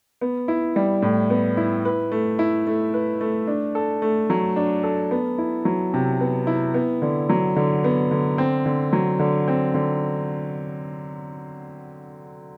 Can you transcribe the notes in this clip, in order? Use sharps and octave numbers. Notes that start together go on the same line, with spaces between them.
B3
E4
G3
A2
B3
E4
B4
A3
E4
A3
B4
A3
D4
A4
A3
F#3
D4
A4
B3
E4
F#3
C3
B3
E4
B3
D3
F#3
D3
B3
D3
C4
D3
F#3
D3
C4
D3